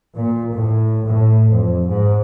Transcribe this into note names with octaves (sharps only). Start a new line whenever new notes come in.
A#2
A2
A2
F2
G#2